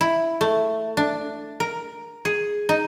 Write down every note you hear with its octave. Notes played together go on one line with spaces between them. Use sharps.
E4
A3
D4
A#4
G#4
D#4